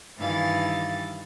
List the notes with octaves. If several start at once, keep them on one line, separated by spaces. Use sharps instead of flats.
G2 D#3 E3 F5 A6